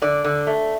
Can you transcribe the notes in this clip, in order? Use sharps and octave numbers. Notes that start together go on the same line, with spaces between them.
D3 D5
D3
A3